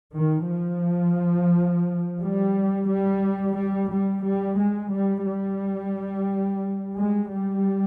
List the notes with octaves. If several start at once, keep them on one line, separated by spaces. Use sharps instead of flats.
D#3
F3
G3
G3
G3
G3
G3
G#3
G3
G3
G#3
G3